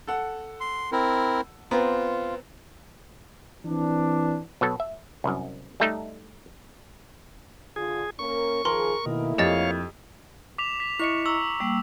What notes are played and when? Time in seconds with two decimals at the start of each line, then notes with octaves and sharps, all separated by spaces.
0.07 A4 F#5
0.61 C6
0.92 C4 E4 A#4
1.71 B3 C4 F4 A#5
3.65 E3 C4 D4
4.61 B2 F#3 A4
4.80 E5
5.24 C2 F#2
5.80 G3 A3 D#4
7.76 D3 F4 G#4
8.19 A#3 C#4 A#4 C#6
8.65 D#3 F3 G#4 A#4 C6
9.06 B2 D#3 A3 A#3 E4
9.38 F2 G4 C#5 D#5 F5 A6
10.58 D6 B6 F7
10.80 B6
11.00 E4 D#5 C#6 C#7
11.26 A#5 C#6 E6
11.60 G3 A#3